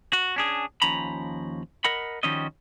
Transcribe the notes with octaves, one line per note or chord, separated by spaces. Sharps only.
F#4
C#4 D4 G#4
D#2 F3 C#4 A#5 B5
A#4 D#5 F#5 B5
D#3 F3 G3 C#4 F#4 D#5